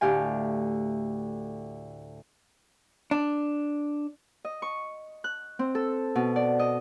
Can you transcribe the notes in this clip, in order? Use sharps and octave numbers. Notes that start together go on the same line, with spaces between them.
D2 A2 G4 F5 G#5
D4
D#5
C#6
F#6
C4
A4
B2
D5
D#5